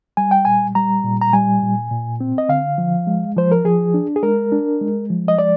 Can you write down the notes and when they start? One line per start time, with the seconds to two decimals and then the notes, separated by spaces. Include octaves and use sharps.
0.17 G3 G#5
0.31 G5
0.45 A#2 G#5
0.75 G3 A#5
1.04 A#2
1.22 A#5
1.33 G3 G#5
1.62 A#2
1.91 A#2
2.21 C4
2.38 D#5
2.49 D3 F5
2.78 F3
3.07 G#3
3.36 F3 C5
3.52 A#4
3.65 F3 G#4
3.94 D4
4.16 G#4
4.23 G#3 A#4
4.52 D4
4.81 G#3
5.10 F3
5.28 D#5
5.38 G#3 D5